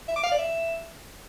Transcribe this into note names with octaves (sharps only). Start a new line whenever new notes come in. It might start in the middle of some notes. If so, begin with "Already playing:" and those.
E5
D6
F5
D5
E5